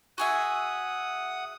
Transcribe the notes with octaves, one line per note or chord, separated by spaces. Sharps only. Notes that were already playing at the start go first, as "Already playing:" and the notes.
F#4 G#4 E5 F#5 D#6